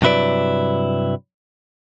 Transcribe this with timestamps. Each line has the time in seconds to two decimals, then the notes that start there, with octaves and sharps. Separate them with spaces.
0.02 G2 C3 F#3 E4 B4 D5